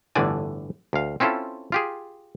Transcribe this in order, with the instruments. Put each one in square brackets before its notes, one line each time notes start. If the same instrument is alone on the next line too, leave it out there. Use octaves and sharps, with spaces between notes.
[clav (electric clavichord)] G1 A2 D3 E3 D5 G#5
D2 F5
C4 C#4 E4 F4 A4
F4 G4 G#4